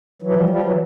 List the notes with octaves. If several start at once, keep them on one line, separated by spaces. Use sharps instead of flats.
E3 F#3
F3 G3
F3 G3
E3 F#3